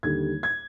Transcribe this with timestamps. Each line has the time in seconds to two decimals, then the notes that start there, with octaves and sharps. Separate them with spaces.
0.03 D#2 D3 G3 G#6
0.43 G#6